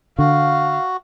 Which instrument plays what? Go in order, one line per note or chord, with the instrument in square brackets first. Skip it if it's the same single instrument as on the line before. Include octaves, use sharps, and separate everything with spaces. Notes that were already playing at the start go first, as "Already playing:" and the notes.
[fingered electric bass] D3 [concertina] F#4 [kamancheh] F5